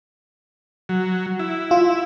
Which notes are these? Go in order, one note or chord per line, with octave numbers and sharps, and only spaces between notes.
F#3
E4
F4